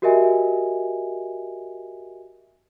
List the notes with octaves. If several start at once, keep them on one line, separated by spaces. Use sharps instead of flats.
F#4 G4 A#4 D#5 E5 G#5